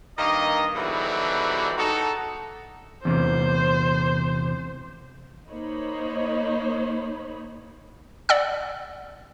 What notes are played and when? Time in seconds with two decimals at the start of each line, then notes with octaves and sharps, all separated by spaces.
0.18 G2 D#3 A#3 A#4 D#5
0.75 G#2 B2 D3 E3 F#3 G3
1.78 D#4 F#4 A4
3.05 E2 C3 C5
5.51 A#3 D#4 C5 C#5 D#5 B5
8.29 D5 F#5 E6